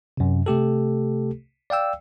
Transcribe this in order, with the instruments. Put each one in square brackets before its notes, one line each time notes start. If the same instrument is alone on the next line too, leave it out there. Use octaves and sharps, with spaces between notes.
[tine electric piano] F#2 C3
C3 A3 G4 A4
D5 F5 G5 E6